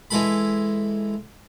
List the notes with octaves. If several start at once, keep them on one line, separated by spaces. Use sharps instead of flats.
E3 G#3 A4 B5